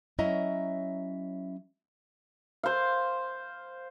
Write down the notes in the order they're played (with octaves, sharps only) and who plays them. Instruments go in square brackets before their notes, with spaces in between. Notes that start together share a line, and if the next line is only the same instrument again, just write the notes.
[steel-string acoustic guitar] F#3 C#4 E4 D#5 E5 A#5
[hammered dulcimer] C5 F5